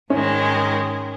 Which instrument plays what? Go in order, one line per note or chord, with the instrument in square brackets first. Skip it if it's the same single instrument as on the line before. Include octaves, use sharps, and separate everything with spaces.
[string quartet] G#2 D#3 G#3 [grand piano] C#4